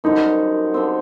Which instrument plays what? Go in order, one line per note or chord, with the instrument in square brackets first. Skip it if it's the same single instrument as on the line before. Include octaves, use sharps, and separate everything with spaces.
[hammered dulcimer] F#2 D3 G3 C4 [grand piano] D#4
[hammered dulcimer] D3 G3 C4